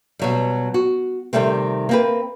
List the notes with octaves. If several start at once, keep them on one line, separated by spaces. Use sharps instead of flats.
B2 F#3 G3
F#4
C3 D#3 G3 A3 C4
A#3 C4 B4